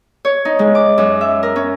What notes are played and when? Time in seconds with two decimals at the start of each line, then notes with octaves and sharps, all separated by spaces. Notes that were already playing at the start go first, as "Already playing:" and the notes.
0.25 C#5
0.45 D#4
0.59 G#3
0.75 D6
0.98 F#2
1.21 E5
1.43 A#4
1.56 C#4